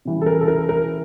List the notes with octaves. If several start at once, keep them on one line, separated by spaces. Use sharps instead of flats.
C#3 E3 G3
A4
A#4
A4
A#4
A#4